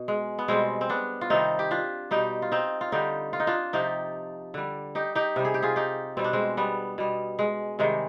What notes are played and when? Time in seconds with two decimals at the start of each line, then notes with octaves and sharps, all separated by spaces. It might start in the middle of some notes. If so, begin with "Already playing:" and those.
Already playing: B2
0.08 G#3
0.39 B3
0.48 B2 G3 G#3 C4
0.81 C4
0.89 B3 D4
1.21 F4
1.30 C3 D#3 G3 C4 D#4
1.59 G4
1.71 D4 F4
2.11 B2 G3 D#4 G4
2.42 F4
2.52 C4 D#4
2.81 F4
2.92 D3 G3 D#4 G4
3.33 F4
3.40 D#4
3.47 D4 F4
3.73 C3 F3 D#4 G4
4.54 D3 G3
4.95 D#4 G4
5.15 D#4 G4
5.36 C3 G3
5.45 G#4
5.54 G4
5.62 F4 G#4
5.76 D#4 G4
6.17 B2 G3 C4
6.24 D4
6.33 G#3 C4
6.57 G3 B3
6.98 B2 G3
7.39 G#3
7.79 C3 D#3 G3 G#3